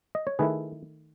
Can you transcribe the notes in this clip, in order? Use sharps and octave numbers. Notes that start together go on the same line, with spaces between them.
D#5
C#5
D#3 A3 E4 G#4 B4